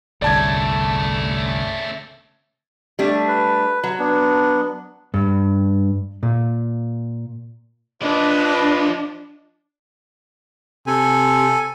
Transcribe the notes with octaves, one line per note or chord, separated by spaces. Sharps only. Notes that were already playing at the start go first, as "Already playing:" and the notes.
G1 C2 C#3 A3 D5 A5 G#6
G3 A3 D4
B4
F#3
B3 D4
G2
A#2
F3 D4 B4 D5 D#5
C3 A4 G#5